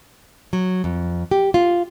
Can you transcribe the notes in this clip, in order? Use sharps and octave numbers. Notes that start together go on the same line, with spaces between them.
F#3
F2
G4
F4